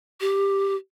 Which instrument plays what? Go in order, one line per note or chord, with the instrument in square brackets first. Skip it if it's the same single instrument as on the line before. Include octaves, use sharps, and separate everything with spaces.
[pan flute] G4